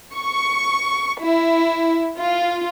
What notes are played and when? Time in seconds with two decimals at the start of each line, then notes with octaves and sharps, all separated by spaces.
0.15 C#6
1.21 E4
2.18 F4